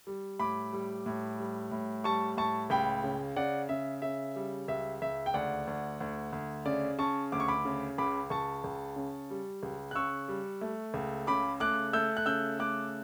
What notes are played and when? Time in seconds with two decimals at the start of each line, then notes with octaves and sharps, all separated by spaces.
0.07 G3
0.40 A2 B5 D6
0.73 G3
1.06 A2
1.39 G3
1.71 A2
2.04 G3 A5 C#6
2.37 A2 A5 C#6
2.70 C#2 G5 B5
3.04 C#3
3.36 C#3 D5 F#5
3.69 C#3 E5
4.02 C#3 E5
4.36 G3
4.68 C#2 E5
5.02 C#2 E5
5.26 G5
5.34 D2 D5 F#5
5.67 D2
6.00 D2
6.32 D2
6.65 C#3 D5
6.98 C#3 A5 C#6
7.32 D2 D6
7.40 C#6
7.48 B5 D6
7.65 C#3
7.98 C#2 B5 D6
8.30 C#2 A5 C#6
8.64 C#2
8.96 C#3
9.30 G3
9.63 C#2
9.91 F#6
9.95 C#3 C#6 E6
10.28 G3
10.61 A3
10.94 C#2
11.27 C#3 B5 D6
11.60 A3 D6 F#6
11.93 A3 E6 G6
12.17 F#6
12.26 C#3 E6 G6
12.59 A3 D6 F#6